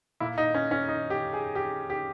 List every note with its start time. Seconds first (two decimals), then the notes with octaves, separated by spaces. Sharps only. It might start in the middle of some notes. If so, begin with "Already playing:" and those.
0.20 A#2 E4
0.38 D#4
0.54 C#4
0.71 C#4
0.89 D#4
1.10 G4
1.33 G#4
1.55 G4
1.90 G4